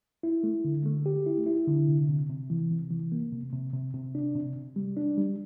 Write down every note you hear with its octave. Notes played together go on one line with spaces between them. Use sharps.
E4
A3
D3
A3
G4
E4
E4
D3
C3
C3
C3
E3
C3
E3
A#3
C3
C3
C3
C3
D4
C3
C3
G3
D4
G3